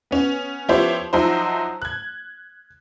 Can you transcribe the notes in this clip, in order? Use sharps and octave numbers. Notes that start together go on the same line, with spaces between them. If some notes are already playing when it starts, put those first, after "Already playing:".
B3 C#4
F3 B3 E4 G4 C5 C#5
F3 F#3 D#4 E4 C5
F#6 G#6